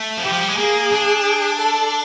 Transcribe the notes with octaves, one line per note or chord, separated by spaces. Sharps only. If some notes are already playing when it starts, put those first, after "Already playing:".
Already playing: A3
F3
E3 G4
F3
G3
G#3
A#3 G#4
D4
A4